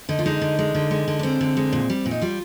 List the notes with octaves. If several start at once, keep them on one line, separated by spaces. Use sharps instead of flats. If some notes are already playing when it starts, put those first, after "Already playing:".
D3 D#4
F4
G#3 D#4
D3
G#3
D3
G#3
D3
D4
G#3 C4
D3
G#3
A#2
G3
A#2
D#4
G3 F4